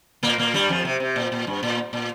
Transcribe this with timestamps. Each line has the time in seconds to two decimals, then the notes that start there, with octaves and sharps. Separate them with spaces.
0.23 A#2 A#3
0.38 A#2 A#3
0.54 G2 G3
0.69 F2 F3
0.85 C3
1.00 C3
1.16 A#2
1.32 A#2
1.47 G2
1.63 A#2
1.93 A#2